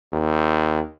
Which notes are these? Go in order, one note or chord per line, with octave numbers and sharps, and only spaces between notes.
D#2